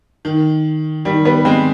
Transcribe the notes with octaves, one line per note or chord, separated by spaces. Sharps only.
D#3
D#3 G3
G3 B3
G#3 C4